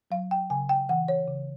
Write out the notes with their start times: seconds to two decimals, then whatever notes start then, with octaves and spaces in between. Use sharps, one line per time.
0.11 F#3 F5
0.31 G5
0.50 C#3 G#5
0.69 G5
0.89 E3 F#5
1.08 C#5
1.27 C#3